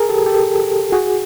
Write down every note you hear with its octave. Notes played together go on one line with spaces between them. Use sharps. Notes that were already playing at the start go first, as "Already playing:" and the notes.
Already playing: G#4 A#4
G4 A4
G4 A4
F#4 G#4